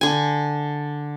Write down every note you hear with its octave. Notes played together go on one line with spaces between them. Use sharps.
D3 G#5